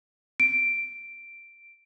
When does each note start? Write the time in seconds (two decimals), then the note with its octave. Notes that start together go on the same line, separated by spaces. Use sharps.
0.40 D7